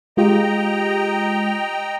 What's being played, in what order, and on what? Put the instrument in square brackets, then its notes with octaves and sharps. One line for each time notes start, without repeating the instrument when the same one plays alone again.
[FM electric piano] G#3 F4 G4 [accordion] D#5 G5 A#5